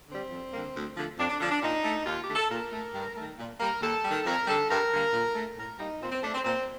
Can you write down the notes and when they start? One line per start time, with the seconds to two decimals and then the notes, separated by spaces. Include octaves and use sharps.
0.09 D3 G3 C4
0.31 F2
0.53 D3 G3 A#3
0.76 D2
0.97 D3 F3 A3
1.18 F2 D4
1.30 D4
1.41 D3 F3 D4
1.51 D4
1.63 A#2 D#4
1.84 A3
2.06 D#2 F4
2.21 G4
2.28 D3 A3
2.36 A4
2.50 A#2 A#4
2.72 A3
2.94 G2
3.17 D#3 A3
3.38 A#2
3.60 G3 A#3 A#4
3.81 D#2 A4
4.04 D#3 G3
4.26 F2 A#4
4.47 D3 G3 A4
4.70 G2 A#4
4.92 D3 G3 A#3
5.13 A#2
5.35 A3
5.57 A2 A#4
5.79 G3 A#3 D#4
6.02 A#2 C4
6.12 C4
6.23 A3 D4
6.35 C4
6.45 A#2 C4